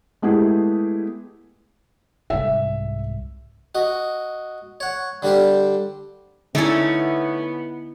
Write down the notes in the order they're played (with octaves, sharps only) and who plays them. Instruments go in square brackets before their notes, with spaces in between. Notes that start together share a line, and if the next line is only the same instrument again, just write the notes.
[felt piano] G#3 A3 B3 E4 G4 G#4
[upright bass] C2 G#2 [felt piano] E5
[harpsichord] F#4 D#5
C#5 F#5
D3 G3 D4 G4 C5
[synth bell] D3 C#7 [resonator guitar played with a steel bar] A3 C#4 [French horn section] B3 [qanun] D#4 E4 D5